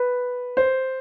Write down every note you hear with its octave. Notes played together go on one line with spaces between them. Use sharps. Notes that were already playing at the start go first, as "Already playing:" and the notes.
Already playing: B4
C5